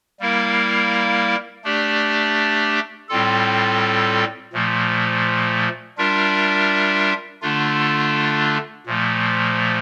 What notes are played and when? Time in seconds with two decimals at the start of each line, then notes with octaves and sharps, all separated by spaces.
0.20 G3 A#3 E4 A#4 F5
1.64 A3 D4 G4 D5
3.09 A2 G3 C4 F4 A4
4.53 A#2 F3 A3
5.98 G3 D4 F4 A#4 E5
7.42 D3 A3 D4 F4
8.87 A#2 F3 A3